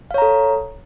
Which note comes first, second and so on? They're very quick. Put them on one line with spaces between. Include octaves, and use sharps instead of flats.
F5 C#5 A#5 A4